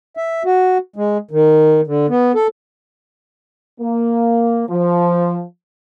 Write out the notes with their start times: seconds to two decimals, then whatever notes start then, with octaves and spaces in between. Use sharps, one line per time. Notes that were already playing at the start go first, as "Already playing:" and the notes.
0.17 E5
0.45 F#4
0.96 G#3
1.31 D#3
1.87 D3
2.09 B3
2.35 A4
3.81 A#3
4.69 F3